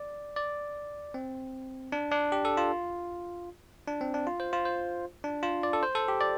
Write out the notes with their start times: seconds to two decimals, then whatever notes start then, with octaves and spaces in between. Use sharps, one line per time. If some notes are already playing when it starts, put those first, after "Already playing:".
Already playing: D5
0.36 D5
1.14 C4
1.92 D4
2.11 D4
2.32 G4
2.45 A4
2.57 F4
3.88 D4
4.01 C4
4.14 D4
4.27 F4
4.40 C5
4.53 F4
4.65 C5
5.24 D4
5.43 F4
5.63 D5
5.73 A4
5.83 C5
5.95 A4
6.08 G4
6.21 D5